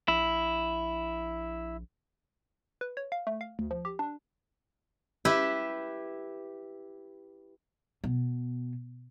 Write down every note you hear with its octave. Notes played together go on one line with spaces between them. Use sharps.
A#1 E4
B4
C#5
F5
A3
F5
D2
F3
G4
D4
E4 G4 B4 E5
B2